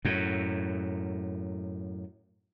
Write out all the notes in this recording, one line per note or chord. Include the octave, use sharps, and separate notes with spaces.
F#2 A2